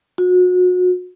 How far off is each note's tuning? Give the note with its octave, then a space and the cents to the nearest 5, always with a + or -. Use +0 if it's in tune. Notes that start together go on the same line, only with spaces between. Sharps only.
F#4 -35